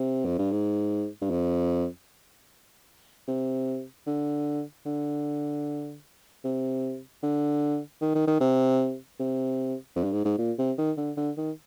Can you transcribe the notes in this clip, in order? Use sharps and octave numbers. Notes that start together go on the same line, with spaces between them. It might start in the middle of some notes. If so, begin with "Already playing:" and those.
Already playing: C3
F2
G2
G#2
G2
F2
C3
D3
D3
C3
D3
D#3
D#3
D#3
C3
C3
F2
G2
G#2
G#2
A#2
C3
D#3
D3
D3
D#3